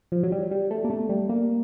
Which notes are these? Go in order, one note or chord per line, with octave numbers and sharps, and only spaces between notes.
F3
F#3
G3
G3
A3
A#3
A3
G3
A#3